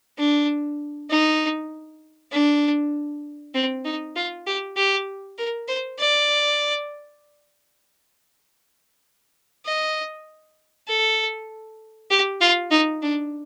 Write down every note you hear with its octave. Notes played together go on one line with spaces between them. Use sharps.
D4
D#4
D4
C4
D#4
F4
G4
G4
A#4
C5
D5
D#5
A4
G4
F4
D#4
D4